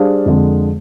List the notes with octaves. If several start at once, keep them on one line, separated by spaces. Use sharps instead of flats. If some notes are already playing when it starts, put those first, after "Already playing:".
Already playing: G3 D4 G#4 C5 F5
F2 D3 G#3